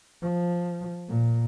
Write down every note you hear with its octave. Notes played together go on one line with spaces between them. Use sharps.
F3
A#2